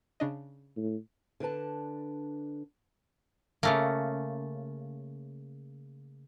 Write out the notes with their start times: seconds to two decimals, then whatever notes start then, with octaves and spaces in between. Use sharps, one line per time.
0.20 C#3 D4 D#5
0.77 A2
1.40 D3 D4 B4 A5
3.63 C#3 A3 A#3